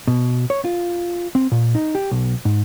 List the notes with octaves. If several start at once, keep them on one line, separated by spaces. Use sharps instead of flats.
B2
C#5
F4
C4
A#2
D#4
G4
B1
G#2